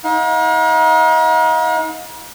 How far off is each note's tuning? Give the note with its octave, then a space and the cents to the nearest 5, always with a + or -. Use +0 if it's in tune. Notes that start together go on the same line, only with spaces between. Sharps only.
D#4 +40 F5 +45